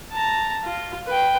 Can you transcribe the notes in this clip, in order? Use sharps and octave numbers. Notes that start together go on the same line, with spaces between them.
A5 A#5
F4
B4 G5